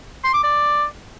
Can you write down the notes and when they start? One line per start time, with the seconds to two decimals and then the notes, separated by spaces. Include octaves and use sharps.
0.24 C6
0.34 D6
0.43 D5